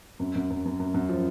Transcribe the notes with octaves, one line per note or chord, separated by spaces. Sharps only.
F#2
F#2
F#2
F#2
F#2
F#2
F3